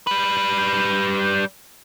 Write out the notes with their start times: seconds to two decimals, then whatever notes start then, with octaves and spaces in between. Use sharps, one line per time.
0.07 G3 B4